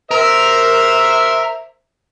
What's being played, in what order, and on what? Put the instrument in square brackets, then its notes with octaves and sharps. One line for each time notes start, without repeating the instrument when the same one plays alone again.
[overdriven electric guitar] A#4 [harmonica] C5 E5